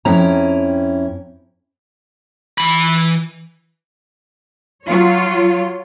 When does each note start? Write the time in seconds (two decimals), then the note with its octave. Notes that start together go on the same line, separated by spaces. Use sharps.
0.05 F2 C#4 E4 G5 A#5
2.58 E3 B5
4.85 F#3 F4 C#5